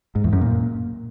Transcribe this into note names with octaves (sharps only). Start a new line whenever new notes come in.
G#2
E2
F#2
A#2